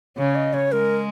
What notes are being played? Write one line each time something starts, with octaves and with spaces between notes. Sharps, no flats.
C#3 C#5
D#5
C#5
G#3 A#4